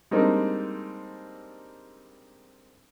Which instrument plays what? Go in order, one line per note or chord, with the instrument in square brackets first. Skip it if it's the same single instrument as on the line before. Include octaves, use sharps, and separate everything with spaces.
[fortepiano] G3 G#3 A#3 C4 D4 D#4